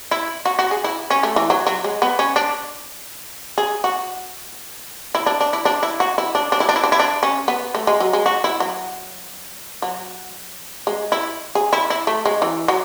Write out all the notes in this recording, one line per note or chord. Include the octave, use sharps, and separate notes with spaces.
E4
F#4
F#4
G#4
E4
C#4
A3
E3
F#3
F#3
G#3
B3
C#4
D4
G#4
F#4
E4
D4
D4
E4
D4
E4
F#4
E4
D4
D4
E4
D4
E4
D4
E4
D4
C#4
B3
A3
G#3
F#3
G#3
F#4
E4
F#3
F#3
G#3
E4
G#4
E4
E4
A3
G#3
E3
F#3